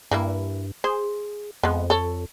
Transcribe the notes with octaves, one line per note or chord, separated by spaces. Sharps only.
G2 E3 A#3 E4
G#4 C5
F2 G#3 B3
A4 C#5